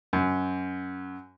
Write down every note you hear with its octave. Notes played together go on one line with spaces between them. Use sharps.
F#2